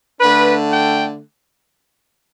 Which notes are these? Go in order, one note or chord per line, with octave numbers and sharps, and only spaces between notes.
D3 A3 D4 B4
G5